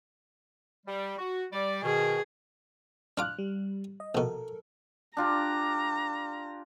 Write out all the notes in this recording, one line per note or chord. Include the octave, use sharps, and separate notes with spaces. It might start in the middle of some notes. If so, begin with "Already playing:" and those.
G3
F#4
G3 D5
B2 D#3 G#4
D4 F4 D6 F6 F#6
G3
D#5
A#1 B2 A4 A#4
D4 F4 G4 A#5